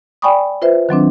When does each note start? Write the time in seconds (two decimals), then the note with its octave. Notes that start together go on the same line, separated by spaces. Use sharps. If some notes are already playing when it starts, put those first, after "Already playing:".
0.22 D5 G5 G#5 B5 C#6 D#6
0.62 F4 B4 C5 E5
0.89 D#3 F#3 C4 D4